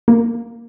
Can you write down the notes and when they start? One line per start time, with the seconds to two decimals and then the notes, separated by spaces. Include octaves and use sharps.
0.08 A#3